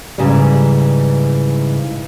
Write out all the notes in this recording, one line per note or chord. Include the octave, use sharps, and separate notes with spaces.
G#2 C#3 E3 G3